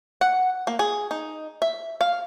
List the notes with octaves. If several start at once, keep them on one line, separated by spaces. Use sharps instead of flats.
F#5
A#3
G#4
D#4
E5
F5